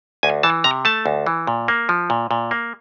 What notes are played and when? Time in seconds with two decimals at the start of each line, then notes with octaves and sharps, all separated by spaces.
0.23 D2 G#5
0.43 E3 A5
0.64 C3 A#5
0.85 A3 A5
1.06 D2
1.26 E3
1.47 A#2
1.68 A#3
1.89 F3
2.10 A#2
2.31 A#2
2.51 A#3